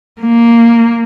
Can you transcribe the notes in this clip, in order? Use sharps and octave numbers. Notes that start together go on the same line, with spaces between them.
A#3